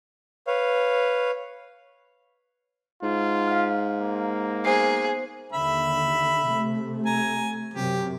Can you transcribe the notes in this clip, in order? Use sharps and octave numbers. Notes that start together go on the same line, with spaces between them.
B4 C#5 F5
G#2 F4
F5 F6
A#3
B3 G#4 C5 C7
D#2 D3 E5 B5
C3 A3
G#5 A#5
F#2 C3 G4